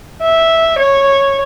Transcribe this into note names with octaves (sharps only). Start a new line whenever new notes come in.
E5
C#5